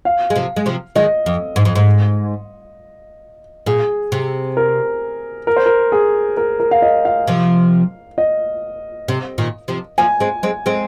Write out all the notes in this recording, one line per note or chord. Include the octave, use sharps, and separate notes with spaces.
F5
G#3
C3 F3
G#3
C3 F3
D#3 G#3 D#5
F2
G#2
F2
G#2
A#2 G#4
C3
A#4
A#4
C5
A#4
G#4
A#4
A#4
F5
D#5
F5
C3 F3
D#5
C3
A#2 D#3
C3 F3
F3 A#3 G#5
G#3 C4
G#3 C4
G#3 C4